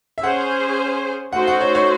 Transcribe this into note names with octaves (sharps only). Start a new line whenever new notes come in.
E5
C#4 G#4 C5 F#5
A3 D#4 F#4 C5 F#5
F#5
C#5
C#5